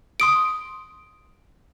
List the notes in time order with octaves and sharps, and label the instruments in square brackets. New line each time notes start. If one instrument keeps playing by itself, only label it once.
[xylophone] C6 D#6 D7